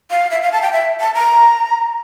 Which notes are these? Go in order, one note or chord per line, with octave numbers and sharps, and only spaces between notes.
F5
E5
F5
A5
G5
E5
A5
A#5